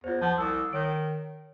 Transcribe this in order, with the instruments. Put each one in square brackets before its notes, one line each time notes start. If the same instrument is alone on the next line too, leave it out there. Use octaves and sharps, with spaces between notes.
[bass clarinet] E2 [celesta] F4 C5
[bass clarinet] F3 [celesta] F#5 A5
[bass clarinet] C2 [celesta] D#6 E6
[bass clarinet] D#3 [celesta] C#5 D7